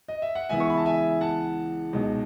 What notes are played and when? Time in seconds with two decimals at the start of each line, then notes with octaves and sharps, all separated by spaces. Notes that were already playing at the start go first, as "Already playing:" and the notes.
0.08 D#5
0.22 E5
0.35 F#5
0.49 C#2 C#3 E3 B3 E5 G#5
0.60 C#6
0.70 B5
0.77 A5
0.86 E5 G#5
1.21 F#5 A5
1.93 C#2 B2 G#3 D#4